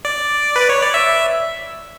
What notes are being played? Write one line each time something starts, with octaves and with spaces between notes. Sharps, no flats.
D5
B4
C#5
D5
E5